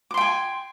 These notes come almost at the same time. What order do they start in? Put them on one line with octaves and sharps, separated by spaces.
D6 C6 G5 G#5